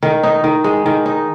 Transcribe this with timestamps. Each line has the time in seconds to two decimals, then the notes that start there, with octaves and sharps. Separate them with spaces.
0.03 D#3
0.23 D#4
0.44 D#3
0.64 G#3
0.86 D#3
1.06 D#4